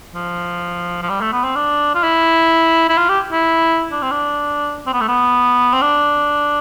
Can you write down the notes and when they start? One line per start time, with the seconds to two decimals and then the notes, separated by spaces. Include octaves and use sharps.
0.15 F3
1.02 F3
1.09 G3
1.21 A3
1.32 B3
1.44 C4
1.56 D4
1.95 F4
2.04 E4
2.89 E4
2.98 F4
3.09 G4
3.32 E4
3.92 D4
4.02 C4
4.11 D4
4.87 C4
4.93 B3
5.01 A3
5.08 B3
5.73 C4
5.82 D4